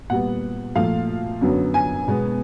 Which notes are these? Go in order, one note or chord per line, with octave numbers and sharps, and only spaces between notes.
A#2 G3 B3 F#5
A#2 F3 A3 F5
F#2 D3 F#3 B3
G#5
B2 G#3 B3